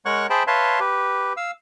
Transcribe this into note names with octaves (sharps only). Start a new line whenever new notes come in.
G#3 A#4 C#5 F#5 C#6 F#6
G#4 C5 E5 G5 A5 B5
B4 C#5 E5 F5 A5 C6
G4 B4
F5 E6